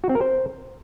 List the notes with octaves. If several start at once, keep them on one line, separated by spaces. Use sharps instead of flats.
F#4
C4
A#4
C5